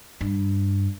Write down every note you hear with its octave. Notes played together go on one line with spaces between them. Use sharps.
G2